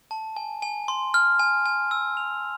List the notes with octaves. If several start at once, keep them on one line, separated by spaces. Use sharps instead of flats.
A5
G#5
G#5
C6
F6
G#5
G#5
E6
F7